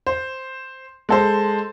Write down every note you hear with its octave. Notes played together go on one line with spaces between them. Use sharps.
C5
G#3 A4 C5